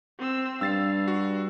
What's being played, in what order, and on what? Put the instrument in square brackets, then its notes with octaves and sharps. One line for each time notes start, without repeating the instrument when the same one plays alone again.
[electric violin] C4 E6
[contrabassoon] G2 [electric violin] F5 [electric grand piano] E6 A6 C7
[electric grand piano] F#4